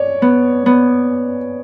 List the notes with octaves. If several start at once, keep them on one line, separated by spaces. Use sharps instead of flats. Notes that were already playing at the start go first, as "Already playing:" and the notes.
Already playing: C#5 D5
B3
B3